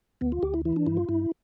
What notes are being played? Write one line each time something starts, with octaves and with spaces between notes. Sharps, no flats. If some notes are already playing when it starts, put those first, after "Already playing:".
D2 B3
F4
D2 G4
E4
E3 E4
D4
G2 E4
F4
G2 E4